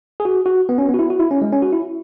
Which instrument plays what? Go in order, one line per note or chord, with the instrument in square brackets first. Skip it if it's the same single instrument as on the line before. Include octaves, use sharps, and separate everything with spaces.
[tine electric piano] G#4
F#4
F#4
B3
C#4
B3
F#4
E4
F#4
E4
C#4
G#3
C#4
F#4
E4